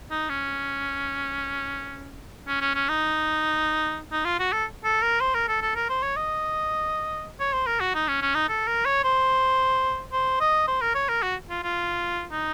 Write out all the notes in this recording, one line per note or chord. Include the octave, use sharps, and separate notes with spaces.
D#4
C#4
C#4
C#4
C#4
D#4
D#4
F4
F#4
A4
A4
A#4
C5
A#4
A4
A4
A#4
C5
C#5
D#5
C#5
C5
A#4
F#4
D#4
C#4
C#4
D#4
A4
A#4
C#5
C5
C5
D#5
C5
A#4
C#5
A#4
F#4
F4
F4
D#4